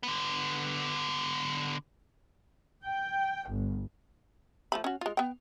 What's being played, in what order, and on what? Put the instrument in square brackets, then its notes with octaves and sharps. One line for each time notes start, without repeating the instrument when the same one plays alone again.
[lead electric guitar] D3 B3
[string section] G5
G1
[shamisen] F3 A3 B5
C#4 F#4
G#3 F4
B3 G5